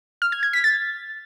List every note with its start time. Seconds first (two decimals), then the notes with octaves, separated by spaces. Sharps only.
0.22 F6
0.32 G#6
0.43 G#6
0.53 B6
0.64 A6